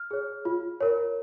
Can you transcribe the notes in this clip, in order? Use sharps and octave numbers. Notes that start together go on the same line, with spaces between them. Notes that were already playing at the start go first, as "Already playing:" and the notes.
Already playing: F6
G#4 C#5
F4
A#4 C#5